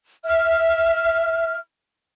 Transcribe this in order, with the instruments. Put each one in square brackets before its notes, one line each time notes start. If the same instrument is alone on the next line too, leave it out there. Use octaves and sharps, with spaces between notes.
[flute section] E5 F6